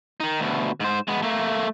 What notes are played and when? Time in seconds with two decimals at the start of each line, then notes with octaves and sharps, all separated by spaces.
0.20 D#3 D#4
0.40 D2 B2
0.80 G#2 C5
1.08 G#3 B3
1.23 A3 A#3